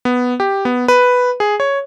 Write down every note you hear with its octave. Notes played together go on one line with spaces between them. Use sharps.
B3
G4
B3
B4
G#4
C#5